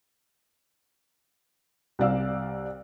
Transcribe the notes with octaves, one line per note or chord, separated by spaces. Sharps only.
C2 C3 D5 F5 E6